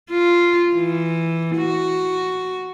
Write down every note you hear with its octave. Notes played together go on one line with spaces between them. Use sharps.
F4
E3
F#4